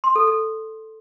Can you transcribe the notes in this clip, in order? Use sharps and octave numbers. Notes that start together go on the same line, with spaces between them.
C6
A4
A4